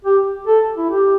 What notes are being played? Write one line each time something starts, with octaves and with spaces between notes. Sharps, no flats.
G4
A4
E4
G4